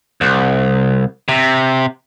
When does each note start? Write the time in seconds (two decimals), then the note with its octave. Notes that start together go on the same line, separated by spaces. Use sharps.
0.21 C2
1.29 C3